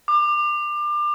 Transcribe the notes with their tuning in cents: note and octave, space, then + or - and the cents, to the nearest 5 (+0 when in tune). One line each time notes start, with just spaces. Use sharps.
D6 +30